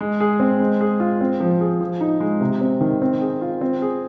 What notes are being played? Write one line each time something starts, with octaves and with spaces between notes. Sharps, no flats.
G#3
G#4
C4
G#3
G#4
F4
C4
F3
G#4
F3
D#4
G#3
C3
C4
D#3
C4
G#4
F4
C4
G#4